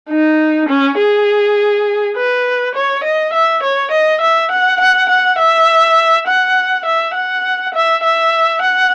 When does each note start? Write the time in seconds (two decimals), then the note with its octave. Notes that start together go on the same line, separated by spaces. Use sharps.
0.10 D#4
0.69 C#4
0.99 G#4
2.16 B4
2.75 C#5
3.04 D#5
3.34 E5
3.63 C#5
3.92 D#5
4.22 E5
4.52 F#5
4.81 F#5
5.09 F#5
5.39 E5
6.28 F#5
6.86 E5
7.15 F#5
7.75 E5
8.04 E5
8.62 F#5